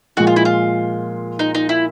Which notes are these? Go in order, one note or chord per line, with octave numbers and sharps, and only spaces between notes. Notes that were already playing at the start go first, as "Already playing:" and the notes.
A#2 F3 G#3 F#4
F4
E4
F4
D#4
D#4
E4